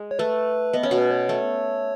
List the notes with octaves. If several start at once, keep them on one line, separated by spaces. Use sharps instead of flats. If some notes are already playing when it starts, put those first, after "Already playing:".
Already playing: G#3
C#5
A3 B4
B3 D#5
C#4 C#5
B2 B3
B4
C#5
A3